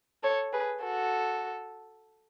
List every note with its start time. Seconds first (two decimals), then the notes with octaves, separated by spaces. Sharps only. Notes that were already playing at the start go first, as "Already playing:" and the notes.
0.23 A4 C#5
0.52 G#4 B4
0.83 F#4 A4